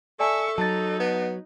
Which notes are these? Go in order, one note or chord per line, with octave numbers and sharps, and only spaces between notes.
A4 D5 E5 G#5 A5 C#6
F#3 D#4 A5 A6
B3